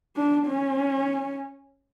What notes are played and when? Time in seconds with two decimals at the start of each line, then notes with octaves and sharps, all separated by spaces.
0.17 D4
0.47 C#4